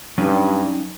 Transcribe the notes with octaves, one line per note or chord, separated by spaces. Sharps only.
G2 F#3 C#4 D#4